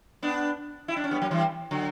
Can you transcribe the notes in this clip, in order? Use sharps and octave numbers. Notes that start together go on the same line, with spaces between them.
B3 D4
E4
D4
C#4
G3 B3
F#3 A#3
E3 G3
D3 F#3